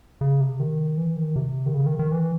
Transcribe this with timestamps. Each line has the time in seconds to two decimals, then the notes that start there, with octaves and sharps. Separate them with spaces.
0.21 C#3
0.41 C3
0.60 D#3
0.98 E3
1.16 D#3
1.36 C3
1.66 D#3
1.74 C#3
1.86 D#3
1.99 D#3
2.12 E3